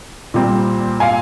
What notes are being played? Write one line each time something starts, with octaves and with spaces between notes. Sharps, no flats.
A#2 G3 C4
F5 G#5